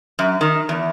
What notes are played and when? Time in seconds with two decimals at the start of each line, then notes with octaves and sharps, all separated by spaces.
0.19 F#2
0.41 D#3
0.69 E2